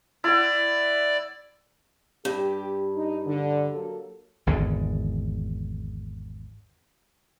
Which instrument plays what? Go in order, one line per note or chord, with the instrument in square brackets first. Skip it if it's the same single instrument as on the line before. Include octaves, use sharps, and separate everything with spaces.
[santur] E4 F#5 [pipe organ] D5
[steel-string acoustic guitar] G2 [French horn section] G4
[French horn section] D#4
D3
F#3 A#3 A4
[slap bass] G#1 E2 G#2 D3